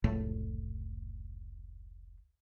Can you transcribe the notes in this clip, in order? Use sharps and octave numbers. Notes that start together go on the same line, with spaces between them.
F1 C#2 A2 A3